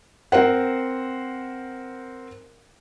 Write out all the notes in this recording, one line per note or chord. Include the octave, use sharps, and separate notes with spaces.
C4 A#4 C5 F#5